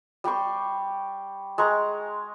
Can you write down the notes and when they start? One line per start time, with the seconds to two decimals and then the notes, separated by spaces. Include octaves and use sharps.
0.24 G3 G4 C6 C#6
1.58 G#3 A#5 C#6